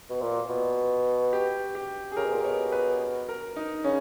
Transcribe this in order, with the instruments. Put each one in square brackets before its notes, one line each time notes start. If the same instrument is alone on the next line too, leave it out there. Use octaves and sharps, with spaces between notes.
[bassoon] B2
A#2
B2
[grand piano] G4
G4
G#4
[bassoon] C#3 [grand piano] A#4
[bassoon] B2
A#2
[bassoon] B2 [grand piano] C#5
[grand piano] B4
A#4
D#4
[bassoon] C#3 [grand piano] C#4